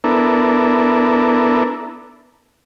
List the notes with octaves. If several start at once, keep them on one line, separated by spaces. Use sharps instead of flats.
B3 D4 E4 A4 A#4